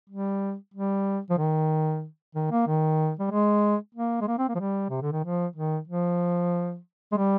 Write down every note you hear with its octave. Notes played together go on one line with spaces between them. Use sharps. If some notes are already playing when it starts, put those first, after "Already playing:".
G3
G3
F3
D#3
D#3
A#3
D#3
G3
G#3
A#3
G#3
A#3
C4
A#3
F3
G3
C3
D3
D#3
F3
D#3
F3
G#3
G3